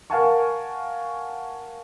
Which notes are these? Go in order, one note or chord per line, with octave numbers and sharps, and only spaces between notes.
A#4 F5 F#5 G#5 A5 C#6